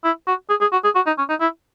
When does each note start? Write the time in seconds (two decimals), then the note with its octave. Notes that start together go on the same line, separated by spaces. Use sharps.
0.04 E4
0.27 F#4
0.50 G#4
0.61 G#4
0.72 F#4
0.84 G#4
0.96 F#4
1.07 D#4
1.18 C#4
1.29 D#4
1.41 E4